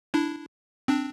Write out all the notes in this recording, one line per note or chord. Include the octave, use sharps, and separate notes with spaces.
D4 E4
C4 D4